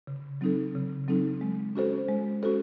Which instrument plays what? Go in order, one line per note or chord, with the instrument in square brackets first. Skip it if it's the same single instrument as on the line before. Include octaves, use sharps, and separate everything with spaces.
[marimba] C#3
F#3 C4 D#4 A4
C#3
F#3 C4 D#4 A4
G#3
C#4 F#4 A4 C5
G#3
C#4 F#4 A4 C5